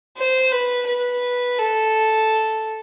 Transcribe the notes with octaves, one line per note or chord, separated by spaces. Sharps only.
C5
B4
B4
A4